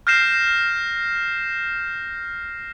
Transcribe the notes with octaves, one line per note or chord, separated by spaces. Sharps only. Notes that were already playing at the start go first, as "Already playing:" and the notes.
F6 G6 A#6 C7 E7